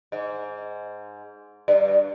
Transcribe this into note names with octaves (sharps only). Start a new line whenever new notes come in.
G#2
G2